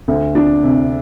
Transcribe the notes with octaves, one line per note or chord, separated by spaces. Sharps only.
D2
D4
C3